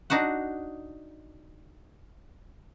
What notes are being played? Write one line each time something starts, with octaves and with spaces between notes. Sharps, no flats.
D4 D#4 F#4 F#5